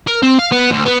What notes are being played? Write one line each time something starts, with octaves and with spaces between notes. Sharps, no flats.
A#4
C4
F5
B3
D2
B3